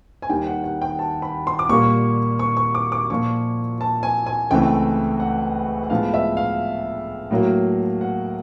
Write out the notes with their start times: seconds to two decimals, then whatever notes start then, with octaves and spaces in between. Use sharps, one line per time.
0.22 G#5
0.29 D#2 D#3 G3 G5
0.46 F#5
0.64 F#5
0.82 G5
0.99 A5
1.22 B5
1.47 C6
1.59 D6
1.69 A#2 G3 A#3 C#6
2.39 C#6
2.57 C#6
2.75 D6
2.92 D6
3.10 A#2 F3 A#3 C#6
3.81 A5
4.03 G#5
4.26 G#5
4.51 C#2 C#3 E3 A3 C4 G5
5.20 F#5
5.83 F#5
5.90 A2 F3 G#3 B3 F5
6.14 E5
6.37 F5
7.31 A2 F#3 A#3
8.01 F#5